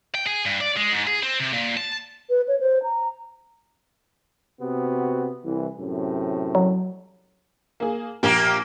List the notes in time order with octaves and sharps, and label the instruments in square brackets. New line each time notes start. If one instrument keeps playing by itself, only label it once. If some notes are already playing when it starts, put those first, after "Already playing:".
[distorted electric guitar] G5
G#4
G2
D5
G#3
G#2
G#4
C4
C3
A#2
A5
[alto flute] B4
C#5
C5
A#5
[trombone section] C3 B3 F#4
C2 E3
F#2 A2 C3
[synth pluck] F#3
[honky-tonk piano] A#3 G#4
[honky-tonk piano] A#1 F7 [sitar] A#3 G4